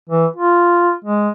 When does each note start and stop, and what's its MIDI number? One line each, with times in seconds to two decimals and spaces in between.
0.09 0.26 52
0.36 0.92 65
1.04 1.29 56